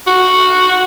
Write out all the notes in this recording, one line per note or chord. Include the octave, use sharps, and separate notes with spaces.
F#4